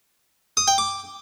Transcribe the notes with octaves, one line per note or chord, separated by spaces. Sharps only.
D#6
G5
D6